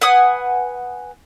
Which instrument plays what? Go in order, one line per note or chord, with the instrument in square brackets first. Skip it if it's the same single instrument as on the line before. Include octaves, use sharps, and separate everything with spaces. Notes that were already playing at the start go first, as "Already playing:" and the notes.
[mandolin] B4 F#5 G#5 D#6